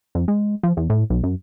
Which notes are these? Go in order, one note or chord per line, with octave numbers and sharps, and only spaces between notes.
F2
G#3
F3
E2
A2
B1
F#2